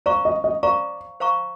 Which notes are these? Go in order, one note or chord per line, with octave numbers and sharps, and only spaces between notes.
C5 D5 F5 A#5 C#6
D#5
D#5
C5 D5 F5 A#5 C#6
C5 F5 A#5 C#6